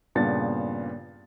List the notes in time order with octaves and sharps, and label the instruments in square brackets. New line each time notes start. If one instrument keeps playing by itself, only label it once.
[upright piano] G2 A#2 C#3 B3 A6